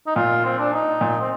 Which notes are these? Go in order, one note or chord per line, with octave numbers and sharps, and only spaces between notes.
D#4
A#2 F4
C4
D4
D#4
A#2
C4